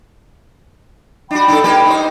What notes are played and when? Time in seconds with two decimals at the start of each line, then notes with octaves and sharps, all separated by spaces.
1.31 D4 F#4 G5 B5
1.48 D4 D#4 A4
1.64 A#3 G4 B4
1.86 D#4 C5